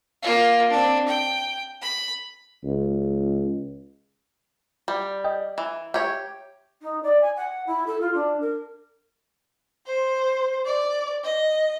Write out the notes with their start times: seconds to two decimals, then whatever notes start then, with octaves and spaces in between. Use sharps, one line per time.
0.22 A#3 F4
0.71 C4 D4
1.08 G5
1.82 B5
2.64 C#2
4.88 G3
5.24 D#5 G5
5.58 E3
5.94 G4 C#5 E5
6.82 D#4
7.03 D5
7.22 G#5
7.36 F#5
7.67 E4
7.87 A4
8.01 F4
8.14 D4
8.41 A#4
9.86 C5
10.66 D5
11.24 D#5